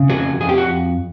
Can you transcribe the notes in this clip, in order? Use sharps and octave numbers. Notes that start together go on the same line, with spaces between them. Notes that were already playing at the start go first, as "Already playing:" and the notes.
Already playing: C#3
F2 F#4 G#4
F2 G#4
G4
F#4